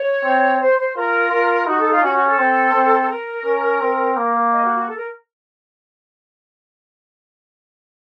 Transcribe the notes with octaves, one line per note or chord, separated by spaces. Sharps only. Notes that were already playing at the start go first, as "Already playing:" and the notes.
Already playing: C#5
C4
C5
C5
F4 A#4
F4
D#4 F#4
A4
F4
C#4 F#4
F#4
A4
C4
C4
A#4
C#4
C4
A#3
D#5
F#4
F#4
A4
A#4